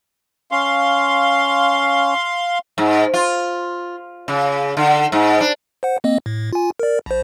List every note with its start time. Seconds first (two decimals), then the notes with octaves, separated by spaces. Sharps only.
0.51 C#4 F5 C6
2.78 G#2
3.14 F4
4.28 C#3
4.77 D3
5.12 G#2
5.40 D4
5.83 C5 F#5
6.04 A#3 C4 D#5
6.26 A2
6.53 F4 G#5
6.80 A#4 D5
7.06 A#1 C5